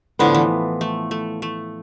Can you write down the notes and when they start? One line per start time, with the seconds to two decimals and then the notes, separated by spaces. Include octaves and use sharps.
0.19 A2 D3 F3 B3
0.35 E3
0.81 A3
1.11 A3
1.42 A3